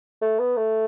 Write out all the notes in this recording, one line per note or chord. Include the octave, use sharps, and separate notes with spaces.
A3
B3
A3